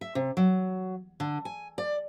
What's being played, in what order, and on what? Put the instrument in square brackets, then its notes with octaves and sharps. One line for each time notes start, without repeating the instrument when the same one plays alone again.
[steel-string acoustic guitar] E5
C3
F#3
D3
G#5
D5